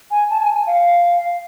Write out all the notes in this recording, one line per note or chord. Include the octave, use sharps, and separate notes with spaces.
G#5
A5
G#5
G#5
F5